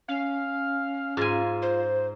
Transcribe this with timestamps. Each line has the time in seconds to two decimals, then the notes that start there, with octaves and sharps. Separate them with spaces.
0.08 C#4 F5
1.17 G#2 F4 G#5
1.62 C5